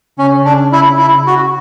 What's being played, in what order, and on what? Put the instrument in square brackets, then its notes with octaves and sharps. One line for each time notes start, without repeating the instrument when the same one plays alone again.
[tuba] C#3 [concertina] C#4
[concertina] D4
E4
E4
F#4